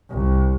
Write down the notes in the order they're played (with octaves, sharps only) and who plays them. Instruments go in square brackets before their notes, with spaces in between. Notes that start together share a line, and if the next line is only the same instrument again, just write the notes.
[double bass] C2